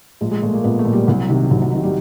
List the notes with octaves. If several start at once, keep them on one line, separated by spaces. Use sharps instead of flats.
A#1 G#3
G#3
A#2 A3
A#3
A#1 B3
A3
A#2
G3
C2 F#3
C3 D#3
C2 F#3
F#3
C3 D#3
G3